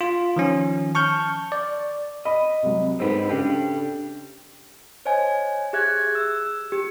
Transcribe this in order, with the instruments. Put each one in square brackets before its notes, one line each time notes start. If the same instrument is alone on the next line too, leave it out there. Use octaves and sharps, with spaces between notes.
[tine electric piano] F4
D#3 F3 C#4
A5 C#6 F6 G6
D5
[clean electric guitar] D#5 [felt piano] B5
[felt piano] C2 F#3
[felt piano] G#2 A4 [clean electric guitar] C4 B4
[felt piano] C#3 A4 [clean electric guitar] D4 G4
[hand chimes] C5 C#5 D#5 G#5
G4 G#4 E5 F#6 G#6
E6
G4